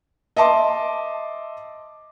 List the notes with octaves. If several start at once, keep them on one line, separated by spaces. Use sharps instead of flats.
D#5 E5 A5 C6 D6